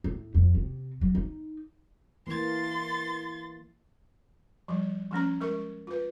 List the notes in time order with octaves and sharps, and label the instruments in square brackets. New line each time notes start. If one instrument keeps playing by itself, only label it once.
[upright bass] A2
F2
C3
F#3
D#4
[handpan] E3 A#3 [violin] C6 A6
[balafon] F3 G3
F3 A3 C#4 A#5
G#3 A#4 C#6
F4 B4